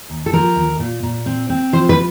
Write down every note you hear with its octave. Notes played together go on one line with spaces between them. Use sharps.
D#2
A4
F3 A#4
D#2
A#2
A#2
C4
C4
F3 C5
B4